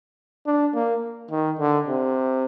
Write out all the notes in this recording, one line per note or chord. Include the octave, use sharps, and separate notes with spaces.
D4
A#3
D#3
D3
C3